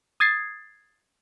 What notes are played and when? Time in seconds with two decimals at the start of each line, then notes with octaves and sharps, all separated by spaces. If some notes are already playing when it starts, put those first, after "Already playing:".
0.20 D#6 G#6 A6 C7